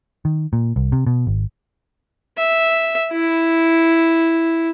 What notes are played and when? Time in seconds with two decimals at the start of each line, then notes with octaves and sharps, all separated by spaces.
0.25 D#3
0.53 A#2
0.76 C2
0.92 C3
1.06 B2
1.27 G#1
2.38 E5
3.12 E4